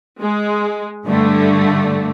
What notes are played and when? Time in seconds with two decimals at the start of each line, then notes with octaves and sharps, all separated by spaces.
0.21 G#3
1.06 G2 D3 A3